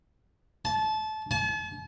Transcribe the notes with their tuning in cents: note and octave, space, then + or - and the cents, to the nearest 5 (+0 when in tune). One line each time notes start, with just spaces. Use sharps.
A5 -25
A5 -45